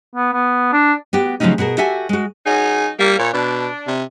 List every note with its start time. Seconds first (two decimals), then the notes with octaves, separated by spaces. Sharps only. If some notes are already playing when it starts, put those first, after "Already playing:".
0.16 B3
0.33 B3
0.72 D4
1.13 B3 F#4 G4
1.40 C#3 F3 F#3 A3 C#4 D#4
1.58 B2 F#4 G#4 A#4
1.78 F#4 G4 A4 E5 F#5 G#5
2.09 G#3 F#4
2.46 F#3 C#4 D#4 G#4
2.99 G3 A#3
3.19 A#2 C#5
3.34 B2 D4
3.87 C3